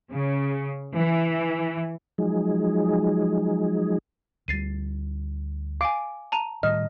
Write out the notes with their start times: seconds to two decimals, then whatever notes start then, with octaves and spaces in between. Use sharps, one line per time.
0.11 C#3
0.96 E3
2.18 F3 F#3 G#3 D#4 G#4
4.48 D2 G3 A6 C7 D#7
5.81 F5 G#5 D6
6.32 A5 A#5 D#7
6.63 A2 D#3 G3 D#5 F6